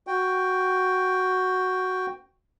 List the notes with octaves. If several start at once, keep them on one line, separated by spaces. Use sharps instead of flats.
F#4 G5